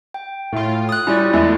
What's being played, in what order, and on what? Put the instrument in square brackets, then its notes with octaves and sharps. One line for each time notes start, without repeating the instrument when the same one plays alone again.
[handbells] G5
[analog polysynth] A2 F4
[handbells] D#6 F#6
[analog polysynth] G3 C#4 [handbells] E4 F4 D5
[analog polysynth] E2 G#3 A3 [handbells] E4